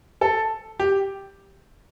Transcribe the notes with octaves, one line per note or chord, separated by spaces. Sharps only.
A4
G4